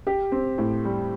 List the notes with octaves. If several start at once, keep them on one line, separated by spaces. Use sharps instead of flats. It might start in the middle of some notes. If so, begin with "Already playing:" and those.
G4
C4
A2
G3